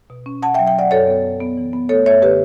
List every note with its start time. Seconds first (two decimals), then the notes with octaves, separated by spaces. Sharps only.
0.10 B2
0.26 C#4
0.42 B2 F#5 A5
0.54 E5 G5
0.59 F#3
0.67 E5 G5
0.75 F#3 D5 F#5
0.91 F#2 A4 C#5
1.07 B3
1.25 F#2
1.40 B3
1.57 E3
1.73 B3
1.89 A3 A4 C#5
2.06 F#2 C#5 E5
2.22 D3 G4 B4